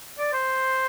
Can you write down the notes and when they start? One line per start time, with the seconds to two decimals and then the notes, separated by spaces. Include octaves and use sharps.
0.19 D5
0.33 C5